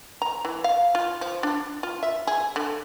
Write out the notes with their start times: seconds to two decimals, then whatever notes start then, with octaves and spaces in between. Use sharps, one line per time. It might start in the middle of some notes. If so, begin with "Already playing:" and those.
0.22 A#5
0.45 E3
0.64 F5
0.95 F4
1.21 F3
1.43 D4
1.83 F4
2.03 E5
2.27 G#4
2.56 D3